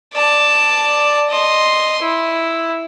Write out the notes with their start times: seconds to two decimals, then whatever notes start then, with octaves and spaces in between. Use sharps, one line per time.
0.14 D5 A5
1.30 D#5 C6
2.02 E4